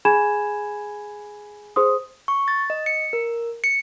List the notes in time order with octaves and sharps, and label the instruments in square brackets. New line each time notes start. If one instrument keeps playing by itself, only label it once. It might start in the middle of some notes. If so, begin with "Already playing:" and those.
[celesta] G#4 G#5 B5 G#6 E7
G#4 C5 C6 D#6
[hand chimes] C#6
A6
D#5
C#7
A#4
C#7